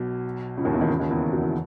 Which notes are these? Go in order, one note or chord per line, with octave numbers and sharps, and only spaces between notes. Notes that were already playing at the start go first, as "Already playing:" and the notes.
Already playing: B1 B2
C#2 C#3
D#2 D#3
E2 E3
D#2 D#3
C#2 C#3
D#2 D#3
E2 E3
F#2 F#3
E3